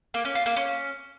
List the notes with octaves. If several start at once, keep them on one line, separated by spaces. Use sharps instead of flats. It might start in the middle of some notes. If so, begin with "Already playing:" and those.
A#3
C#4
F4
A#3
C#4